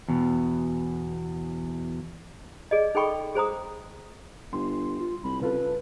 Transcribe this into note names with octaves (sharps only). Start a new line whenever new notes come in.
E2 B2
G#4 D5 D#5
D#4 G#4 A4 G5 B5 C#6
G#4 C5 A#5 D#6
G1 C6
F4
C2 B5
C#3 F4 A4 B4